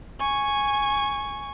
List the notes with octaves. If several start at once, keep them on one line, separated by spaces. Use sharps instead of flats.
G#5 C#6